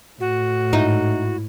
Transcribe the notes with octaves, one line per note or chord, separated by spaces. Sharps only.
A2 F#4
G#2 D#4 E4